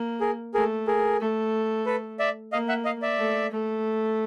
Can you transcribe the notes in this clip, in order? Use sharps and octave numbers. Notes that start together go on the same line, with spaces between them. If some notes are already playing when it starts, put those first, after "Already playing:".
Already playing: A#3
G#4 A#4
A3 G#4 A#4
G#4 A#4
A3
A4 B4
D5 E5
A#3 D#5 F5
E5 F#5
D#5 F5
D5 E5
A3
A3